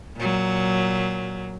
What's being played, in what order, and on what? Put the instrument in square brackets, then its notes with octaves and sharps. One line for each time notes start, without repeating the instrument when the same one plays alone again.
[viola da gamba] A#2 F#3